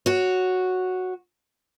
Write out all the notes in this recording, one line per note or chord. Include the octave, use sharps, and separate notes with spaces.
F#4 C#5